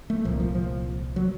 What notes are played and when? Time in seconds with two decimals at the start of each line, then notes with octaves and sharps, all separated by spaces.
0.10 A3
0.24 C2 A#2 F3
0.40 F3
0.55 F3
1.16 F#3